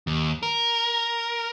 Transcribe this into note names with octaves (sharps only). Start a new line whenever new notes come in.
D#2
A#4